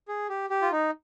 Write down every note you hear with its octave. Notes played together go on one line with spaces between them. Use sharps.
G#4
G4
G4
F4
D#4